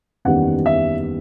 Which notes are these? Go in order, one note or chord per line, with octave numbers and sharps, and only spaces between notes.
F#1 E2 D#3 G3 F#5
E5